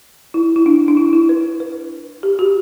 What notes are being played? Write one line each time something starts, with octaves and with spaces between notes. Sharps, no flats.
E4
E4
D4
D4
E4
E4
B4
B4
G4
F#4